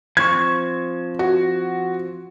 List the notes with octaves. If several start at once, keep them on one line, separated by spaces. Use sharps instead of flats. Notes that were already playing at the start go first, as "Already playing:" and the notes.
F3 C4 C#6 G#6
F#4